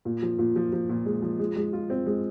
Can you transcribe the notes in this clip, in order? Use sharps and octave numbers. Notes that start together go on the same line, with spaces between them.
A#2
F3
A#2
F3
F3
A#2
G#3
F3
G#3
G#3
F4
C4
G#3